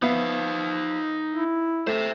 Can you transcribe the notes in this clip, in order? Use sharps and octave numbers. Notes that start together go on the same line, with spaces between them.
F3 B3 D#4 E5 F5
E4
A3 C5 E5